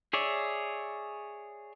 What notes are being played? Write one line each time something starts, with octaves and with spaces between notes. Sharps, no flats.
G#4 C#5 D5 E5